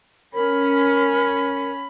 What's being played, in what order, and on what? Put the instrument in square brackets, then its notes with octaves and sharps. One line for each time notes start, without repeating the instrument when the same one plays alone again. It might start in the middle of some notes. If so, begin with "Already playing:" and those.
[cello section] C#4 [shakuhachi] A#4 [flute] B5